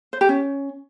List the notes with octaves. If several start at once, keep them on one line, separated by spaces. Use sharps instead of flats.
C5
G4
C#4